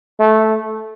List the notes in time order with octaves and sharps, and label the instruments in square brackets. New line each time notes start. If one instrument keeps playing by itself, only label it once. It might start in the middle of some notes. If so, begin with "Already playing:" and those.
[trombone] A3